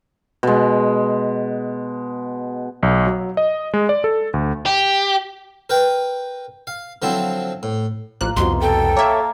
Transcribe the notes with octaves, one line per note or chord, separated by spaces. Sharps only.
B2 G#3
B1
F#3
D#5
G#3
D5
A4
D2
G4
A#4 B4 G5
F5
D3 F3 F#3 C4 E4
A2
A1 F3 A#3 F#6
C2 F2 B2 C6
A4 G5
A#3 C#5 E5